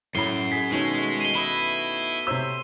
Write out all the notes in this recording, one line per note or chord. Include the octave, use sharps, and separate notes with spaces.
F#2 A2 C#5 B5 C7 G7
G#4 B6
B2 D#3 G#3 A3 C#4
D#7 G7
E4 B4 D#5
C3 C5 C#5 E5 E6